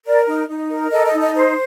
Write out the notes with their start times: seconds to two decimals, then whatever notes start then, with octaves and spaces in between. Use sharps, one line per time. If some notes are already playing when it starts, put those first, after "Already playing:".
0.05 A#4 D5
0.27 D#4
0.49 D#4
0.70 A#4
0.92 A4 D#5
1.07 D#5
1.13 D#4
1.20 D#5
1.35 C5